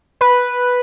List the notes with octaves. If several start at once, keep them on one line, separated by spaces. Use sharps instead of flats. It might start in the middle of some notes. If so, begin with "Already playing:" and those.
B4